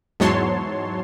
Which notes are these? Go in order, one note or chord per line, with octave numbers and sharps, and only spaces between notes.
E2 G#2 F#3 C#5 A5 C6